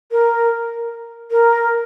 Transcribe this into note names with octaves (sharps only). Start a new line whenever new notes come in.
A#4
A#4